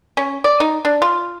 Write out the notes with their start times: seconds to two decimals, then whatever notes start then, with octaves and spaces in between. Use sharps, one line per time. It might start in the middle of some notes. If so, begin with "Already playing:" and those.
0.17 C#4
0.44 D5
0.60 D#4
0.85 D4
1.02 F4